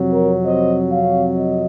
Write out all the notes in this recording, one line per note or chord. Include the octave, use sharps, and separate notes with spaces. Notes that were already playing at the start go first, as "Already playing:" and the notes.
Already playing: F2 C3 F#3
A#4 C#5
C5 D#5
C#5 F5
D#5